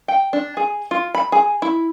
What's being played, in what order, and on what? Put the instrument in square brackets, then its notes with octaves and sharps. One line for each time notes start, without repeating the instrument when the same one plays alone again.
[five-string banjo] G5
D4
G#4
F4
B5
G#4
E4